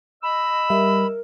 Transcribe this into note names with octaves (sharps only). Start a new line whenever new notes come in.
D#5 B5 E6
G3 A#4 E5